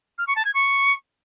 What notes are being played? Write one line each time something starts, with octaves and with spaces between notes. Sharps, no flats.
F6
C#6
A5
G#6
C#6